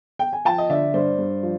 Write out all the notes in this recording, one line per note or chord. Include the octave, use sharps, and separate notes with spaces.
G5
G#5
F3 G5 A5
D#5
D3 D5 E5
G2 C5 D5
G2
F3